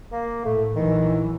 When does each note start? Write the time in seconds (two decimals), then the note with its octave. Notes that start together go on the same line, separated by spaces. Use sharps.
0.12 A#3
0.45 A2 A3
0.76 A#1 D#3 E3 F#3